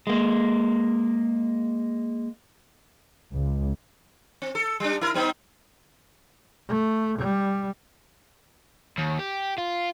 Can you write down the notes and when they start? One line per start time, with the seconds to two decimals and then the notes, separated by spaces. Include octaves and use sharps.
0.07 G#3 A#3
3.33 C#2
4.42 C4
4.55 A4
4.80 G3 D4
5.01 E4 A#4
5.14 G3 B3 D#4
6.69 A3
7.18 G3
8.99 D#2
9.19 G4
9.58 F4